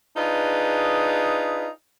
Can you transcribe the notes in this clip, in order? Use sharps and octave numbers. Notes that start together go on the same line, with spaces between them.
D4 D#4 F4 G#4 B4